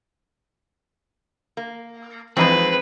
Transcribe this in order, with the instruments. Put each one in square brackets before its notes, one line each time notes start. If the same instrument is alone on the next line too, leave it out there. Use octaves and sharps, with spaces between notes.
[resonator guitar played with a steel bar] A#3
[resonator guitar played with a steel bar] F2 G#3 C4 [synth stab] E3 F3 D#4 [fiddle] B4